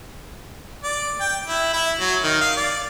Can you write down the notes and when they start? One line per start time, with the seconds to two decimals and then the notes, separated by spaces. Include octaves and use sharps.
0.84 D5
1.20 G5
1.48 E4
1.74 E4
2.00 F#3
2.23 D#3
2.41 F5
2.57 D5